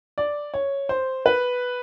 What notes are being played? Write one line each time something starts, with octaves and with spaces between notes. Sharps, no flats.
D5
C#5
C5
B4